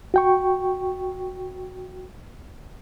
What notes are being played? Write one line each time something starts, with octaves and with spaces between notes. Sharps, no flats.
F#4 G5 C#6